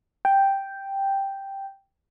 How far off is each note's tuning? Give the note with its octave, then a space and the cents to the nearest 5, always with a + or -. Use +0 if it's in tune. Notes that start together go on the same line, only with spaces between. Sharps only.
G5 +0